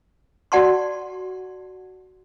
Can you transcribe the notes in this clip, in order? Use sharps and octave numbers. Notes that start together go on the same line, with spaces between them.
F#4 D5 F#5 A5 C6 C#6